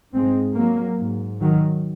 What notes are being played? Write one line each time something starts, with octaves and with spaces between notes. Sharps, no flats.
G#2 G#3 C4
F#3 A#3
G#2
D#3 F#3